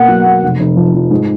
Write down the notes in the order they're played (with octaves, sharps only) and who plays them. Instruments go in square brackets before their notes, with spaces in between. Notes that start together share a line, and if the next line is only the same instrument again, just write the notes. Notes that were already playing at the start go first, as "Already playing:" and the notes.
Already playing: [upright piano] B2 A#3 [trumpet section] F#5
[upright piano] F#3
A#3
F1
F1
F3
F3
G#2